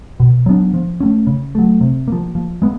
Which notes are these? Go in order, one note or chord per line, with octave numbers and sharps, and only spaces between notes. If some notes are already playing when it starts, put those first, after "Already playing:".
B2
F#3 B3 D4
F3
A3 C#4
C#3
F#3 A3
C3
F3 A#3
F3
G#3 B3